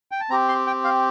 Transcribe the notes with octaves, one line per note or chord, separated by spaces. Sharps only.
G5
A5
C4 G4 A#5
C6
G5
F5